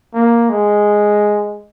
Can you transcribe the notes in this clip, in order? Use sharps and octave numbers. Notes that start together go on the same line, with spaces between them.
A#3
G#3